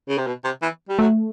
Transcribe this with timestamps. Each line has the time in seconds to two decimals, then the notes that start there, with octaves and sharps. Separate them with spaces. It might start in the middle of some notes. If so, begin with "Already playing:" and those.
0.09 C#3
0.18 C3
0.27 B2
0.44 C3
0.62 E3
0.89 G3
0.99 F#3 A3